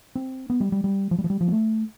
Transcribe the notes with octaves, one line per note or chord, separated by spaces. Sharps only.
C4
B3
G3
G3
G3
F3
G3
F3
G3
F3
B3
A3